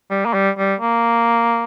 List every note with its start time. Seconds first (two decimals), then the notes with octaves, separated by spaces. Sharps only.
0.10 G3
0.26 A#3
0.34 G3
0.58 G3
0.80 A#3